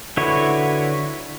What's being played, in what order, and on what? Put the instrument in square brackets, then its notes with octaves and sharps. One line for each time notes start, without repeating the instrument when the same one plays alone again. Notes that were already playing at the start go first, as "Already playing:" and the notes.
[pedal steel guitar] D3 E4 F#4 B4 C#5